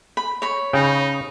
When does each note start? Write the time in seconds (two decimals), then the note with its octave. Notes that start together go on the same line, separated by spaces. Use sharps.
0.17 B5
0.42 C#5 B5
0.73 C#3 D#4 G5